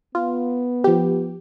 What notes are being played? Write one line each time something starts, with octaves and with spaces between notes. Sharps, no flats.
B3 F4
F3 G4